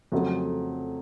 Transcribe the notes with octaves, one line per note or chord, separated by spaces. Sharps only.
F2 C#3 F#3 A3